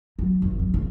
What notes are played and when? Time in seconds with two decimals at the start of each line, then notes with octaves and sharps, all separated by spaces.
0.19 F#3
0.42 G#1
0.59 F#3
0.74 C#3